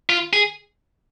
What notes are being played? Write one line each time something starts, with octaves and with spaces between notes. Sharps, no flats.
F4
G#4